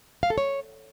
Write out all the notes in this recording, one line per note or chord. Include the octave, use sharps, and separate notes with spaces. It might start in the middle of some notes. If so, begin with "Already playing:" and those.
F5
A4
C#5